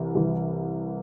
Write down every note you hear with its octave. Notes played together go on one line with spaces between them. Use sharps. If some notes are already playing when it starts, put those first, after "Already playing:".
Already playing: C2 C3 E3
C2 C3 E3